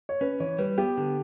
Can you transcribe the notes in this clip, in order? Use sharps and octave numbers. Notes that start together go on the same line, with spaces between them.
C#5
C#4 B4
E3 C#5
G3 B4
B3 G4
D3